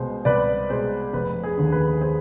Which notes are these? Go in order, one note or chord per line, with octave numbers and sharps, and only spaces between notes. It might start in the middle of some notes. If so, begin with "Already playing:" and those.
Already playing: C2 B2 G#3 C5
C2 B4 D5
B2 G#3 G#4 C5
F1 B4
G#4
D#2 D3
B4
G#4 C5